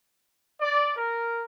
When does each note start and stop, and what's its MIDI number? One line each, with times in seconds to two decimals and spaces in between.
0.61 0.95 74
0.96 1.43 70